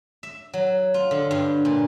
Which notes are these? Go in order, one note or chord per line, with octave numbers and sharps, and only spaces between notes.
E5
F#3
F4
D3
G2
A#2